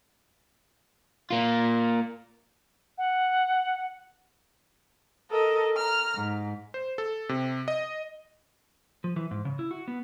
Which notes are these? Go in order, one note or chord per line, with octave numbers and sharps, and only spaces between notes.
A#3 F4
F#5
A4 A#4 D#5
A#5 F6
G#2
C5
A4
C3
D#5
F3
E3
G#2
C#3
E4
F#4
B3